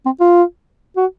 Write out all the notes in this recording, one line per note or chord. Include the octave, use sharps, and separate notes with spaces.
C4
F4
F#4